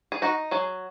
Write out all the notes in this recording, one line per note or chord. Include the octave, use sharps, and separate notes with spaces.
G#4
D#4 F#4
F#3 G#4